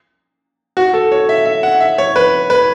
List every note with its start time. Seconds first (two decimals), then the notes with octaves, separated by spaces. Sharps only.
0.77 F#4
0.94 A4
1.12 C#5
1.29 E5
1.45 E5
1.63 F#5
1.80 E5
1.98 C#5
2.16 B4
2.50 B4